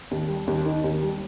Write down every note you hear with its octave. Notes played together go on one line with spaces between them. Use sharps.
D#2
G3
D#2
D#3
D#2
G3